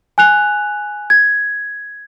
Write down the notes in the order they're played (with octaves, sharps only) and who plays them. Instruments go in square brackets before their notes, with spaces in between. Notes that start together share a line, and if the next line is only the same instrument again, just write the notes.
[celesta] G#5 F#6 F7
G#6